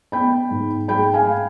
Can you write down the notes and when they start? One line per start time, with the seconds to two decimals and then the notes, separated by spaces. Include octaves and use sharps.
0.12 B3 G5 B5
0.51 G#2
0.88 G#3 G5 B5
1.14 F5 G#5